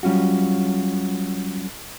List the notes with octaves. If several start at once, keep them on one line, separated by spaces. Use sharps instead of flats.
F#3 G3 C#4 F4 F#4